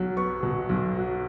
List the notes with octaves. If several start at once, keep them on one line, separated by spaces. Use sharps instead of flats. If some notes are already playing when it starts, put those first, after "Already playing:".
Already playing: B1 F#3
B3 C#6
B2
B1
F#3